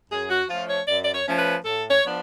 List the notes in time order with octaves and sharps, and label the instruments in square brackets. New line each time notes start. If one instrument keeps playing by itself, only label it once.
[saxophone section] F#2 G#4
F#4
F3 A3 C#4 F4
C#5
F#2 D5
D5
C#5
F3 A3 C#4
B4
A2 A4
C#5
F3 B3 D4